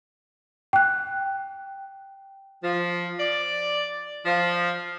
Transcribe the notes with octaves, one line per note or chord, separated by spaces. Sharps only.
G5 F#6
F3
D5
F3